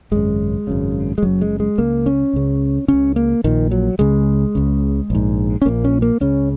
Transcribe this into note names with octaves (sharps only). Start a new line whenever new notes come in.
G#1 F#2 C#3 G#3
G#1 F#2 C#3
G#3
F#1 F#2 C#3 F#3
G#3
G#3
C#2 C#3 A#3
C#4
C#2 C#3
C#2 C#3 C#4
A#3
A#1 A#2 D#3
F#3
C#2 C#3 G#3
C#2 C#3
A#1 G#2
C#4
A#1 A#2 A#3
C#4
A#3
C#2 C#3 C#4